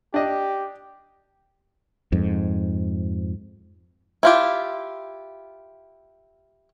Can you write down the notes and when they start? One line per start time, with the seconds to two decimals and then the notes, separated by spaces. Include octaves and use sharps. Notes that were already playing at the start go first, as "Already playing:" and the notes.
0.14 D4 G4 D#5
2.12 F2 G#2
4.23 E4 F4 G4